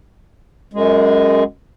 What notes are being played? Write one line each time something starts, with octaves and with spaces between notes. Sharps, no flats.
F#2 G#3